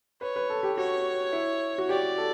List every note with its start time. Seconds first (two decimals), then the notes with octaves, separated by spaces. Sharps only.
0.21 B4 C#5
0.36 B4
0.50 A4
0.63 G4
0.77 F#4 C#5
1.33 E4
1.78 F#4
1.89 G4 D5
2.18 A4